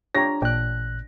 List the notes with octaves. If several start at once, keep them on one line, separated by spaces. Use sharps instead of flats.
D4 F4 G4 C#5 A#5 A#6
A1 A#2 D4 G5 F#6